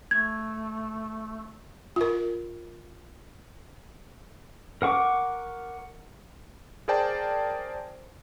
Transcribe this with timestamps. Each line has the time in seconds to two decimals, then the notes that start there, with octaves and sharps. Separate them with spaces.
0.11 A3 G#6
1.96 F4 A#4
4.82 A#4 F#5 C#6 D6
6.88 G#4 A#4 C5 D5 G5 A5